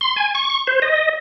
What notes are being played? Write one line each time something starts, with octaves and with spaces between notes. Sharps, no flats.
C6
G#5
C#6
C5
D#5